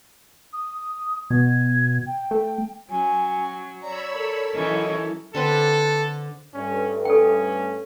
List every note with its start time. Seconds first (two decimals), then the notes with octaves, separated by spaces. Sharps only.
0.53 D#6
1.30 B2 G#6
2.06 G5
2.31 A3
2.90 F#3 C#4 G#5
3.82 C#5 D5 A#5 B5 E6
4.13 A4 A#4
4.54 E3 F#3 C#4 D#4 E4 D#5
5.35 D3 C4 A4 B4
6.54 G2 A3 C#4
7.05 C#4 A4 G5